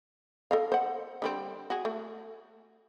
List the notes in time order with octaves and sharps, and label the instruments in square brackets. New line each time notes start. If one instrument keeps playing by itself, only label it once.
[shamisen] A4 D#5 F5
C5 F#5
D3 G3 C4
F#4 G#4
A3